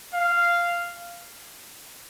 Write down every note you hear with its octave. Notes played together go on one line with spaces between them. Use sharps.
F5